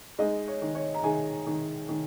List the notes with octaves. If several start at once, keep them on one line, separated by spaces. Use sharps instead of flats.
G#3 D#4 D#5
C#5
D#3
C#5
A#5
D#3 G#4 G#5
D#3
D#3